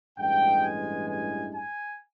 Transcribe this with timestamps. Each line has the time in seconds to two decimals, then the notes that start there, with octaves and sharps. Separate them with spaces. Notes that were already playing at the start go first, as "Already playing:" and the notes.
0.18 A1 G2 E3 G#3 G5
0.63 G#5
1.09 G#5
1.55 G#5